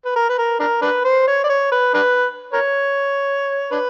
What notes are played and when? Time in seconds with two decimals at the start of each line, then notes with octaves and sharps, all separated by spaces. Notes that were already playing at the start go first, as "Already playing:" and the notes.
0.05 B4
0.16 A#4
0.30 B4
0.38 A#4
0.60 D4 A#4
0.82 D4 B4
1.05 C5
1.27 C#5
1.44 D5
1.49 C#5
1.72 B4
1.94 D4 B4
2.53 A#4 C#5
3.72 D4 B4